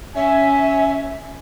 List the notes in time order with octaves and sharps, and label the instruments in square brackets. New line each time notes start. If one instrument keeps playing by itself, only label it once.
[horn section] C#4 G#5 [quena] E5